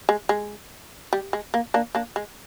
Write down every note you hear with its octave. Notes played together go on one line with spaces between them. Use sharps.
G#3
G#3
G3
G#3
A#3
A#3 D4
A#3 D4
G#3